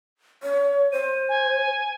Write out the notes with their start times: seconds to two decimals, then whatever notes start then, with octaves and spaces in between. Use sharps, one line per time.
0.43 C#5
0.92 C5 D#7
1.29 G#5